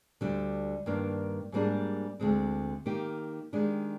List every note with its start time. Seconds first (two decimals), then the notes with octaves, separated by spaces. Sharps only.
0.21 D2 D3 G3 D4
0.86 G2 D#3 A#3 D4
1.52 G#2 G3 A#3 D4 G#4
2.20 D2 D3 G#3 C4
2.86 D#3 A#3 D#4 G4
3.53 D#3 G#3 D4 G4